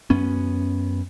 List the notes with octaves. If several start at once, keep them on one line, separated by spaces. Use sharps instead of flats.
F#2 B3 C#4